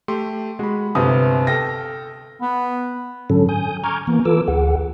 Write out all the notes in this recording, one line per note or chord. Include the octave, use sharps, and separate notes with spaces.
A3 G4 C6
G#3 F#4 B5
G1 C3 B3 D#6
A4 G5 F6 A#6
B3
G#2 D3 F#3 C#4 A4
G#5 D#6 G6
A#5 C#6 D6 F6 G6 G#6
E3 A#3 B3
E3 F4 A4 B4 D6 E6
D2 G#4 F#5